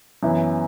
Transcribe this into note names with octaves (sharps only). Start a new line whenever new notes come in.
F#2 E3 B3 E4